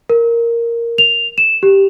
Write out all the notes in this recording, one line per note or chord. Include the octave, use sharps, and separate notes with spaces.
A#4
F7
E7
G4